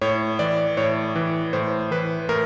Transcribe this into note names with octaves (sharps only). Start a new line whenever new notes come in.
A2 C#5
E3 D5
A2 C#5
E3
A2 C5
E3 B4
A2 A#4